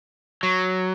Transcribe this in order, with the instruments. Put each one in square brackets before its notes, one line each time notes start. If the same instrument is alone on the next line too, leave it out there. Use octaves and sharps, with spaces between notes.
[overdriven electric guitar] F#3